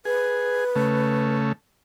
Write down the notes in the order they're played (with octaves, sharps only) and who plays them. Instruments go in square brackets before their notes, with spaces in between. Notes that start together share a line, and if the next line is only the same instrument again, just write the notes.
[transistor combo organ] G#4 [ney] B4
[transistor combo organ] C#3 A3